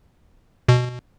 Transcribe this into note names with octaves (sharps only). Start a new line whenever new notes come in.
B2